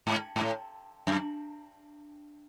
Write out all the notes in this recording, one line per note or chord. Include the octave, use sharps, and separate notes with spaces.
G#2
G#2
A2
F#2